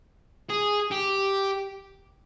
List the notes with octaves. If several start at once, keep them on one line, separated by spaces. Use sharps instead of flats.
G#4
G4